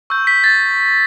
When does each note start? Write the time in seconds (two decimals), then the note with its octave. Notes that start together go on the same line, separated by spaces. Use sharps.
0.10 C#6 E6 G6
0.27 B6
0.44 A6